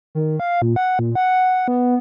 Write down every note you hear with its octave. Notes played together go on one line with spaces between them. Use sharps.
D#3
F5
A#2
F#5
A#2
F#5
B3